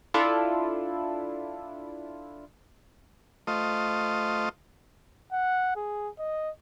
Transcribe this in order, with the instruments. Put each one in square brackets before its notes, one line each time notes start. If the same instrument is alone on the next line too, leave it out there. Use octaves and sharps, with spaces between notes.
[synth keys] D4 E4 F4 A4
[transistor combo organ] A3 F4 C5 D#5
[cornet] F#5
G#4
D#5